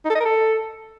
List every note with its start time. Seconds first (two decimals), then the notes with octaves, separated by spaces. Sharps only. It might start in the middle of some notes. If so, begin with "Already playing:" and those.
0.05 D#4
0.10 A4
0.15 D#5
0.20 A#4
0.25 A4